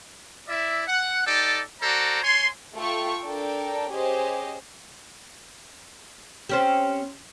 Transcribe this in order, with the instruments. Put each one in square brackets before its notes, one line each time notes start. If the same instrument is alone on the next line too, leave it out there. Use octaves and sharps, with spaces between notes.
[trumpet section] E4 D5 E5
F#5
D#4 G4 A4 D5
F#4 A4 C5 D5 A#5
C#5 G#5 C6
[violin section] A3 F4 A4 G5 C#6
D4 A4 A#4 G5
C#4 G4 G#4 C5 D#5
[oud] C4 C#4 G4